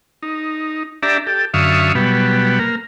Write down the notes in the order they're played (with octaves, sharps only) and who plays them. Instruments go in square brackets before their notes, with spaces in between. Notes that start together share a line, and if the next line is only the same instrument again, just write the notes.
[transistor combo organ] D#4
D4 G4 D5 E5 A#5
G4 A4
F#2 D3 E5 F5 C#6 D#6
B2 F#3 G3 B3
A#3 A#4